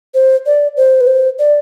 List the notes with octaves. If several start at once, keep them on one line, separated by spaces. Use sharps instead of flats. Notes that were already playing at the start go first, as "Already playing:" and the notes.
C5
D5
C5
B4
C5
D5